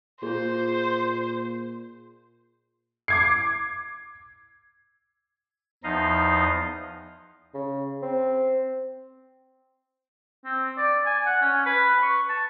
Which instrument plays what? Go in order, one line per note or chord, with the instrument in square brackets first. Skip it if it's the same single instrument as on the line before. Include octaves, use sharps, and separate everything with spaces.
[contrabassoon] A#2 [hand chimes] F4 G#4 [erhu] C5
[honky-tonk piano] D6 G#6 C7
[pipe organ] E2 F3 D#4 D#5 F5
[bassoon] C#3
C4
[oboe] C4
D5
G#5
F#5
C#4
B4
C#6
A5